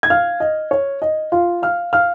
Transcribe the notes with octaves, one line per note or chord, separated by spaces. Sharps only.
G#6
F5 F6
D#5
C#5
D#5
F4 F5
F5 F6
F5 F6